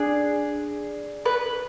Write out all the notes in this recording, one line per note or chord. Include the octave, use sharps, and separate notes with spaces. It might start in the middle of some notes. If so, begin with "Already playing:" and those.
Already playing: D4 G#4
B4